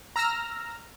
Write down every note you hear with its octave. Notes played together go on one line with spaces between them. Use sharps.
A#5 E6 F6 A#6